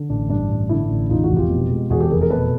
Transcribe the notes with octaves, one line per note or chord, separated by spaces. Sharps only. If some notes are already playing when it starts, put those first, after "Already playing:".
Already playing: D3
A1 D4
G2 D4
A1
D3 D4 E4
A1
E2 D#4 F4
E4 F#4
F1
F4 G4
B2
G#3
E2 F#4 G#4
G4 A4
F1 G#4 A#4
G#4 A#4
B2 A4 B4